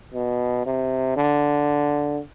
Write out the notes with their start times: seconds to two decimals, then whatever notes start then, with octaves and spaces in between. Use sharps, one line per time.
0.14 B2
0.66 C3
1.16 D3